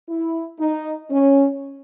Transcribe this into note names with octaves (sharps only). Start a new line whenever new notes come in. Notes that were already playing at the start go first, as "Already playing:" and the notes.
E4
D#4
C#4